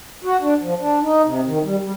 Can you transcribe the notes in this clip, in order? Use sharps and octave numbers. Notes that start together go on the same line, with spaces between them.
F#4
D4
F3
D4
D#4
C3
D#3
G3
G3